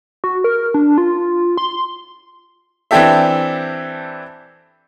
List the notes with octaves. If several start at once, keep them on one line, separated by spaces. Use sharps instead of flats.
F#4
A#4
D4
F4
C6
E3 C4 D4 G4 A4 E5